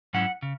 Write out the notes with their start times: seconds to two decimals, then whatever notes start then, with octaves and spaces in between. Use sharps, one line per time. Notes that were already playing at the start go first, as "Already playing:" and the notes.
0.13 G#2 F#3 C#4 E4 F#5
0.42 C#3